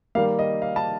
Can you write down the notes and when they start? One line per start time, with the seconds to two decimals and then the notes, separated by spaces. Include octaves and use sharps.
0.15 D#3 G3 A#3 F5
0.39 D#5
0.62 F5
0.76 A5